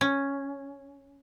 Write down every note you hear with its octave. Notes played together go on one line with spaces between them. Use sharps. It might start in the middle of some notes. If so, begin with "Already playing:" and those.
C#4